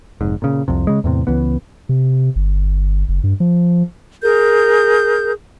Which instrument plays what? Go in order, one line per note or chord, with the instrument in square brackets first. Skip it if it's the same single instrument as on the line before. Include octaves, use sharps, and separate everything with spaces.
[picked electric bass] F1 G#2
A#2 C#3
C2 F2 C3
C#3 G#3
E2 A2 C3
C#2 E3 B3
[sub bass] C3
G1
F#1
G2
F3
[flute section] G#4 A#4 G6